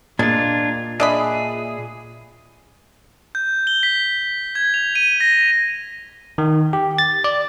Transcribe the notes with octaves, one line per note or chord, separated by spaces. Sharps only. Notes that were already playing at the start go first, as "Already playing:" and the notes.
A#2 G#3 D4 F4 G#6 A6
D4 G#4 D#5 E5 B5
G6
G7
B6
G#6
F7
D#7
A#6
D#3
G4
A6
D5